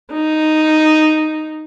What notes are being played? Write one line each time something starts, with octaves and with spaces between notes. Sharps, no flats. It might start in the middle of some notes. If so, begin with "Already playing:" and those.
D#4